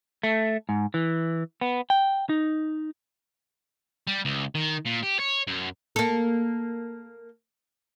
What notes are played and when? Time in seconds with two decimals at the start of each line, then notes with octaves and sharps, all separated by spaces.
0.23 A3
0.69 G#2
0.94 E3
1.61 B3
1.90 G5
2.29 D#4
4.07 G3
4.25 C#2
4.55 D#3
4.85 A#2
5.03 G4
5.19 C#5
5.47 F#2
5.96 A#3 A4